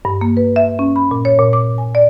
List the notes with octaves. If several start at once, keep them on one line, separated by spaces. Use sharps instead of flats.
G2
A#3
B4
E5
C#4
B5
A#2
C#5
A#2
D6
G#5
D5